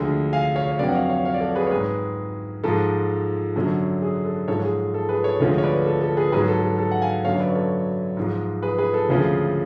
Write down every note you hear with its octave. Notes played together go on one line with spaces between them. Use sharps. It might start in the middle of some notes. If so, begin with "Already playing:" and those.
Already playing: D2 D3 F3 G#3
F5 G#5
C#5 F5
C#5
F2 D3 F#3 B4 D5
F#5
C#5 F5
C#5 F5
C#5 F5
D5
A4 C#5
G#4 B4
C#5
G#2 G#3 G#4 B4
G#2 F3 G#3 A4
F#2 D3 F#3
G#4
A4
G#2 F3 G#3 A4 C#5
G#4
A4
G#4 B4
A4 C#5
D2 D3 F3 G#3 A4 C#5
C#5
B4 D5
A4
A4
G#4 B4
G#2 F#3 G#4 B4
A4
A4
A4
F#5
F5 G#5
F#2 D3 F#3 C#5 F5
C#5
B4 D5
A4 C#5
G#2 F3 G#3
G#4 B4
G#4 B4
A4
D2 C#3 F3 G#3 A4